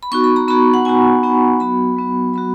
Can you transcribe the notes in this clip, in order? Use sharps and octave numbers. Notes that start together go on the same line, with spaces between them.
B5
B3 D#4 F#4 C#6
B5
A#5
B3 D#4 F#4 B5
F#5
B3 D#4 F#4 G#5
B3 D#4 F#4
F#3 B3 F#4 B5
F#3 B3 F#4
F#3 B3 F#4 B5